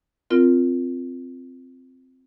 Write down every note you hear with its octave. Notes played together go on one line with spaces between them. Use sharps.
C4 F4 A#4